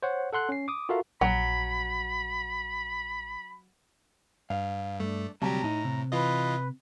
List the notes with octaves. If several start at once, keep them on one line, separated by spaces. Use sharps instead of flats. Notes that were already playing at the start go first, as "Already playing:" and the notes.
C5 C#5 F#5
A4 F#5 C6 F#6
C#4 C7
D6 D#6
F4 F#4 A4 A#4 E5 F5
A#1 F#3 B5
G2 F5
G2 A3 D4
D2 C3 F#3 G3 G4 A5 A#5
A2 D#4
C3
E3 F4 B4 D#5